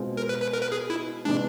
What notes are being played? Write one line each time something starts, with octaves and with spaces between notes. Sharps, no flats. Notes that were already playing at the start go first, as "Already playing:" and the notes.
Already playing: B2 G#3 C4 F4
A#4
B4
B4
A#4
B4
G#4
E4
C3 E3 G#3 D4